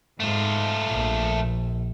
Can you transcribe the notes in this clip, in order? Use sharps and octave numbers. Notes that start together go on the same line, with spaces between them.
G#2 A3 F4
A#1